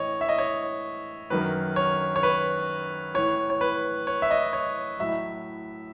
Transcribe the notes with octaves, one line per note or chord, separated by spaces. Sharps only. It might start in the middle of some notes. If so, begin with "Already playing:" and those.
Already playing: A2 E3 C#5 D#5
E5
D#5
C#5
F#2 D#3 F#3 B4
C#5
C#5
B4
A2 E3 C#5
C#5
B4
C#5
E5
D#5
C#5
A2 F#3 E5